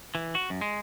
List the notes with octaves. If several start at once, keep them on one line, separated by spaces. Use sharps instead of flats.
E3
F#4
F#2
G#3